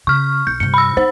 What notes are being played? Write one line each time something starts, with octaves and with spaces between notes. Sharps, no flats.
C#3 C#6 F6
B1 G6
G2 C3 C#7
B5 E6
D#4 C5